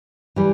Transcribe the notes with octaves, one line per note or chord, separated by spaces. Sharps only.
E3 G3